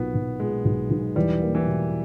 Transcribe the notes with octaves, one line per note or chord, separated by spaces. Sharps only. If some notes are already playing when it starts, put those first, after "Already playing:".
Already playing: B1 A#2 B3
B1
A#2 G#3
B1
B1
E2 G3
A#3
E3
B2